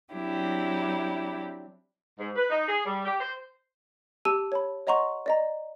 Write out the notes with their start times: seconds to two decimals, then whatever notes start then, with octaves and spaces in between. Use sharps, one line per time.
0.13 F#3 C4 D4 E4 G4
2.19 G#2
2.36 B4
2.50 D#4
2.69 G#4
2.85 G3
3.05 G4
3.20 C5
4.25 G4 A5 E6 D#7
4.52 C#5 A5 B5
4.87 C#5 D#5 F#5 A#5 C6 C#6
5.26 D5 D#5 A#5